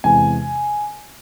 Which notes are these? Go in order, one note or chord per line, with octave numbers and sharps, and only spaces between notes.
E2 C3 E3 G#3 G#5